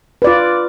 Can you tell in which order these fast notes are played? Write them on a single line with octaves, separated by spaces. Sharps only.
B4 D5 F4